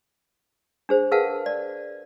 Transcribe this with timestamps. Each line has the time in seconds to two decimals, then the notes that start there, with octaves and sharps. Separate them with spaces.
0.89 D4 G#4 C5
1.11 G#4 A#4 B4 F5 F#5 A5
1.46 D5